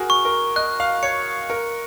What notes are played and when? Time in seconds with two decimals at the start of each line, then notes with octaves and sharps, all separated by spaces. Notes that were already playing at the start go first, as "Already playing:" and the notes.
Already playing: F#4 G#4 A#4
0.10 C#6
0.25 A#4
0.56 D#5 F#6
0.80 F5
1.03 C#5 C#7
1.50 A#4 C#7